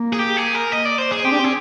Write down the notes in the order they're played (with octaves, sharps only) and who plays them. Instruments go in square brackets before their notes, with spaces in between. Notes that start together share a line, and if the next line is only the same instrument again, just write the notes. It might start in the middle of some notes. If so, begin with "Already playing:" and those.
Already playing: [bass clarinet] A#3
[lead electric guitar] G#4
G4
G#4
A#4
D#5
D5
C5
G#4
[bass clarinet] C4 [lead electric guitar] G4
[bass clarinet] D4
C4
[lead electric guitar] G#4